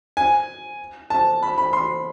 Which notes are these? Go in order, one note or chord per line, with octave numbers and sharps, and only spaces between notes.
G#5
A5
B5
B5
C6